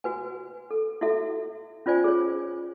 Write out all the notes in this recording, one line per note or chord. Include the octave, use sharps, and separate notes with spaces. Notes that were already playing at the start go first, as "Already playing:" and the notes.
F#4 B4 G#5
A4
E4 F#4 A4 E5
C#4 F4 C5 D5 G#5
G#4 C#5